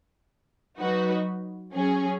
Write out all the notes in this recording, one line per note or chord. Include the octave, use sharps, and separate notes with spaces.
F#3 D#4 F#4 B4
F#3 C#4 G#4